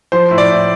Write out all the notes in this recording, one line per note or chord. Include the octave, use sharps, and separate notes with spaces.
F3 C5
A2
D5
A2